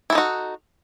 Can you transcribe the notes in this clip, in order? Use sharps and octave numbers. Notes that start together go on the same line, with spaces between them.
D#4 E4 F#4 A4